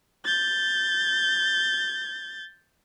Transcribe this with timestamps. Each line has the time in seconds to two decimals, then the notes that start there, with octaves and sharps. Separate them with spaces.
0.25 G6 A6